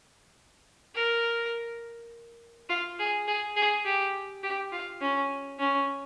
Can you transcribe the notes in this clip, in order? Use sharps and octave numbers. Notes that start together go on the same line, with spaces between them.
A#4
F4
G#4
G#4
G#4
G4
G4
F4
C#4
C#4